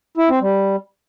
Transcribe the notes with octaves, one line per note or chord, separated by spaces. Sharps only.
E4
C4
G3